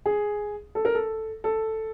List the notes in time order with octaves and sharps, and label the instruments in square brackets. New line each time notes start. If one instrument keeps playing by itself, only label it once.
[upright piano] G#4
A4
A#4
A4
A4